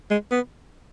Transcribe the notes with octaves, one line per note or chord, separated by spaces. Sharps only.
G#3
B3